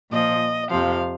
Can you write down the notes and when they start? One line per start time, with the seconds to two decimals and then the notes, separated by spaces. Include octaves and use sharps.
0.11 A#2 F3 D#5
0.70 F2 C3 F3 F5